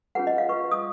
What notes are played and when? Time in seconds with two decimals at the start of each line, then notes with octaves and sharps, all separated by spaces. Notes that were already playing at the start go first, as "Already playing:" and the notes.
0.15 C#4 F4 G#4 B4 F#5
0.27 D#5
0.38 F5
0.49 F4 B4 C#6
0.72 D#6